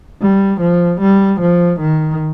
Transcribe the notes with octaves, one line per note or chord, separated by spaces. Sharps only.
G3
F3
G3
F3
D#3